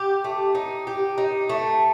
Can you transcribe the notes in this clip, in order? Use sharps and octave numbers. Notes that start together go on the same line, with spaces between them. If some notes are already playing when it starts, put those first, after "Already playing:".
Already playing: G4
A3
D#4
G4
D#4
A3